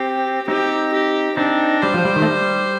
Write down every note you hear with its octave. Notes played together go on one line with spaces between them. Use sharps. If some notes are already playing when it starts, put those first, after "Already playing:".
Already playing: C4 G4
C4 D#4 G4
G4
C4 D4 D#4
G3 C5
F3
G3
D#3
A3
G3